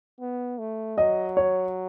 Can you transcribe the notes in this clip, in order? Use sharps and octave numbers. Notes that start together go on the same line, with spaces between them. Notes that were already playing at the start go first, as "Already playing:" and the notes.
B3
A3
F#3 D#5
C#5